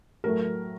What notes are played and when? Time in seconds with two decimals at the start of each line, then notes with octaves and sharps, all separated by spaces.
0.24 A2 F#3 A3 A#4